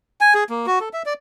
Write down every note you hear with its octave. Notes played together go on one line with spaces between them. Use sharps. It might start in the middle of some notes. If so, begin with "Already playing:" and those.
G#5
G#4
A#3
F#4
A4
E5
D5